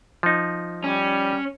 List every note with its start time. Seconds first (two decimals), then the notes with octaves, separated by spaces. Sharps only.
0.23 F3 D#4
0.84 G3 C#4